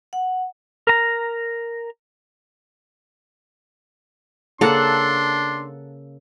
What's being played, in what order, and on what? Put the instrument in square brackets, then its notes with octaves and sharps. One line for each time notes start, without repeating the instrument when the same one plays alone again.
[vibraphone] F#5
[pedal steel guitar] A#4 A#5
[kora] C#3 A#3 [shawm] D4 [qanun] A4 F#5 [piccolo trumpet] C6